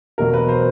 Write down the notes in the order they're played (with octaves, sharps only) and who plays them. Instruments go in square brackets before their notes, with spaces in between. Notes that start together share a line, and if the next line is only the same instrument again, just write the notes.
[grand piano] E2 B2 F#3 A#4
B4
C5